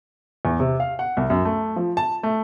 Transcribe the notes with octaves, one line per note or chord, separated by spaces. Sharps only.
E2
C3
F5
F#5
C2
F#2
A3
F3
A5
A3